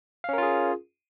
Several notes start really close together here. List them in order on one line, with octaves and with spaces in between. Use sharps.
F5 C#4 A#4 F4 G#4